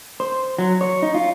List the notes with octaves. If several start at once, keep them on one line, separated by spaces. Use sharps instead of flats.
C5
F#3
C#5
D#4
F4